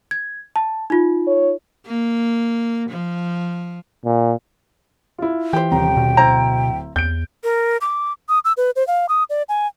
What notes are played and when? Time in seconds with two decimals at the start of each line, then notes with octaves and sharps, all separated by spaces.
0.11 G#6
0.56 A5
0.90 D#4 F4
1.27 C#5
1.86 A#3
2.90 F3
4.05 A#2
5.18 E4 F4
5.53 E3 G4 C5
5.72 D#1 C3 G5 A#5
5.97 B2
6.17 D1 E4 C5 A#5
6.96 E2 G6 D7
7.44 A#4
7.81 D6
8.29 D#6
8.45 E6
8.57 B4
8.76 C5
8.87 F5
9.09 D#6
9.30 D5
9.49 G#5